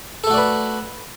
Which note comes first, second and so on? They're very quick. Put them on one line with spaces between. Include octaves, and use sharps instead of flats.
A4 A3 F#4 D5 B4